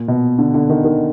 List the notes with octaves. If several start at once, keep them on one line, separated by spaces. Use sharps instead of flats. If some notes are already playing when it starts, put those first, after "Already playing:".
Already playing: A#2
B2
D3
D3
D#3
D#3